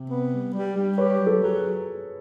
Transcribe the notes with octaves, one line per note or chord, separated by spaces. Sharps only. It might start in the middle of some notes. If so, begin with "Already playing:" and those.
Already playing: C3
B3
G3
G3
G3
G4 B4 C#5
F#3
A4 B4
F#3 G#4